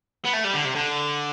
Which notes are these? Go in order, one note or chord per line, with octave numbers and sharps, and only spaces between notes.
B3
A3
G3
D3
C3
D3